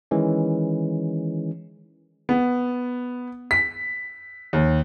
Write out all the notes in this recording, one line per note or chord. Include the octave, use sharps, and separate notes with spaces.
D#3 E3 G#3 C#4
B3
B6
D#2